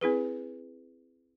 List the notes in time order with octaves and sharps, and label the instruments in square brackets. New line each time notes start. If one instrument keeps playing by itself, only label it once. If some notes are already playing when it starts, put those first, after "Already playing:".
[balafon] C4 E4 G#4 B4